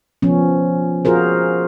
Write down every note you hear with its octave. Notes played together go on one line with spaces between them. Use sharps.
F3 B3 C#4
F4 F#4 G#4 A#4 C5